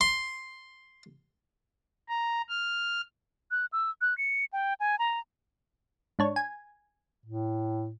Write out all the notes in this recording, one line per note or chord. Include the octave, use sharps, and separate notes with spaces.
C6
A#5
F6
F#6
E6
F#6
C#7
G5
G#5
A#5
G#2 D4 C#5
G#5
A2